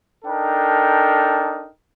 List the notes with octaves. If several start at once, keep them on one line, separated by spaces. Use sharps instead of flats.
D4 D#4 A4 A#4 G5